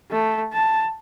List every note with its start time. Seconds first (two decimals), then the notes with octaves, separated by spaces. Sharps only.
0.11 A3
0.53 A5